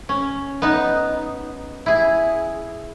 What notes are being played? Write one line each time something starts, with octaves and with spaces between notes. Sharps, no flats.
C#4
B3 D#4
E4 G#4